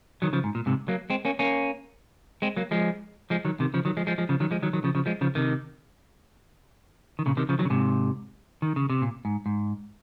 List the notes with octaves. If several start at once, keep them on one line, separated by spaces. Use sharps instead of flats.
D#3 F#3
C#3 F3
G#2
A#2
G#2 C3
F#3 A#3
G#3 C4
A#3 C#4
A#3 C#4
G#3 C4
F#3 A#3
F3 G#3
F3 G#3
D#3 F#3
C3 D#3
C#3 F3
D#3 F#3
F3 G#3
F3 G#3
F3 G#3
C#3 F3
D#3 F#3
F3 G#3
D#3 F#3
D#3 F#3
C#3 F3
C#3 F3
F3 G#3
C#3 F3
C3 D#3
D#3
A#2 C#3
C3 D#3
C#3 F3
D#3 F#3
C#3
G#2 C3
D#3
C#3
C3
A#2
G#2
G#2